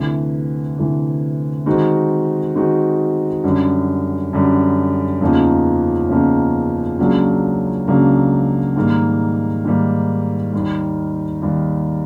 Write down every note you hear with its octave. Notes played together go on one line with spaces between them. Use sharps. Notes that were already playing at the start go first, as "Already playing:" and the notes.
Already playing: D2 C3 E3
D2 C3 E3
D#3 G#3 C4 D#4 F#4
D#3 G#3 C4 D#4 F#4
F#2 D3 G3
F#2 D3 G3
E2 C#3 F3 A#3 D#4
E2 C#3 F3 A#3 D#4
C#2 C#3 F#3 A#3 D4
C#2 C#3 F#3 A#3 D4
G#2 D#3 G3 A#3
G#2 D#3 G3 A#3
D#2 D#3 G3
D#2 D#3 G3